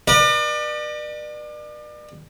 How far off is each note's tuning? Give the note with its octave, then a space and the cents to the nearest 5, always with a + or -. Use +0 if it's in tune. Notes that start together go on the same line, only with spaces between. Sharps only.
B4 -40 D5 +35